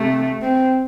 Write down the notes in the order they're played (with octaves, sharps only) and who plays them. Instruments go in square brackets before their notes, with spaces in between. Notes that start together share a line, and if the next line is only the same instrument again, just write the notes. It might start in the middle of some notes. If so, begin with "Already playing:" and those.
Already playing: [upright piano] C3 [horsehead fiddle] A3
[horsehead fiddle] C4